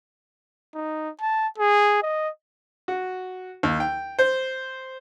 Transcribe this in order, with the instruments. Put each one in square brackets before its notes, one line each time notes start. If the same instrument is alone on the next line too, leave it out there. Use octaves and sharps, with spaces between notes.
[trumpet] D#4
A5
G#4
D#5
[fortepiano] F#4
D#2
G5
C5